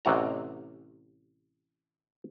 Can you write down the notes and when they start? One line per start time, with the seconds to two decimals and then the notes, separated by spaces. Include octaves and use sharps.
0.05 A1 C3 F#4 A#5